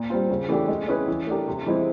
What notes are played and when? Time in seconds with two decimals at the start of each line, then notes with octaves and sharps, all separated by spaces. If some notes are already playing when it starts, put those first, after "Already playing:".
Already playing: A#2
0.10 G3 C4 F4
0.30 C#3
0.49 E3 A3 D4 G4
0.68 G#3
0.88 C#4 E4 G#4 B4
1.08 E3
1.27 A3 D4 G4 A#4
1.48 C3
1.66 E3 G#3 C4 E4